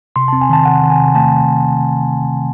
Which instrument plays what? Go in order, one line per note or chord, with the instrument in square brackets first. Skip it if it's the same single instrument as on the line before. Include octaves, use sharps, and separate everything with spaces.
[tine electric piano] C3 C6
C4 A5
G#5
D#3 A5
C3 F#5
D#3
G#5
C3
A3 A5